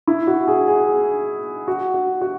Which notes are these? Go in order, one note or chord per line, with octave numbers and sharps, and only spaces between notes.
E4
F#4
G#4
G#4
F#4
F#4
F#4